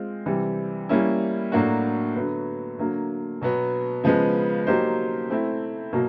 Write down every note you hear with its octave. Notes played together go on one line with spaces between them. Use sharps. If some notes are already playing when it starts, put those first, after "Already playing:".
Already playing: G#3 C4 F4
C3 E3 G3
G3 A#3 C#4 E4
A2 F#3 A#3 D4 F#4
D3 F#3 B3
D3 F#3 A#3
B2 F#3 B3
C#3 F3 G#3 B3
F#3 A#3 D#4 G4 C5
A3 C4 E4
B2 F#3 A#3